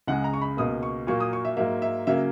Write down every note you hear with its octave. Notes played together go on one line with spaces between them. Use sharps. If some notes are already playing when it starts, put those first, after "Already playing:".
C#2 C#3 G#3 F#5
A#5
C#6
B5
C#2 B2 A#3 D#6
C#6
A#2 F#3 A#3 C#6
D#6
C#6
E5
G#2 F#3 A#3 E5
E5
C#3 F#3 A#3 E5